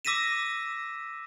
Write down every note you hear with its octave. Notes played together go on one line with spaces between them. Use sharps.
D6 E6 A#6 B6 D#7 E7